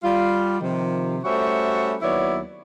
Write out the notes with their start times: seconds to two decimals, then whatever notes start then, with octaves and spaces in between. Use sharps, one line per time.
0.03 G3 F4
0.60 C3 D#3 F3
1.23 G3 A3 C#4 F#4 C5 E5
2.02 D#2 F#3 B3 E4 C#5 D5